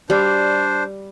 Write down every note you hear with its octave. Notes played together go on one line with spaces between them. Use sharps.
G3 D4 C5